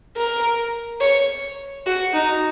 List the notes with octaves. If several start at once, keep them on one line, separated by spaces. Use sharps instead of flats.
A#4
C#5
F#4
D#4